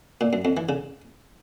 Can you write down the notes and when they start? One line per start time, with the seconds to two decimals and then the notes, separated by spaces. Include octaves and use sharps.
0.21 A#2
0.33 F#2
0.45 F2
0.57 E3
0.69 C#3